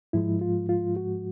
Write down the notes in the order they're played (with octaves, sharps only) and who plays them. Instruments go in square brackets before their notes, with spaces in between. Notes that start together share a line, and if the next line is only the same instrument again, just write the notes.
[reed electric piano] G#2 F3 G#3 E4
F4
F4
F#4